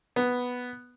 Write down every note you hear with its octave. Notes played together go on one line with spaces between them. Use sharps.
B3